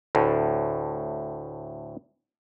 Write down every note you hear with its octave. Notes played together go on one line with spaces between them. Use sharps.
D2 A2